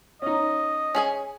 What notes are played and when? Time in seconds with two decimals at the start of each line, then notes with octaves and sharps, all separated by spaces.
0.22 C#4 D#4 D#5
0.95 C#4 G#4 G#5